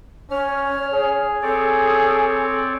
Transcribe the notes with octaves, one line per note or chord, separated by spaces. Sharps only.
C#4 C#5 F6
G#4
C4 A4 C#5 D5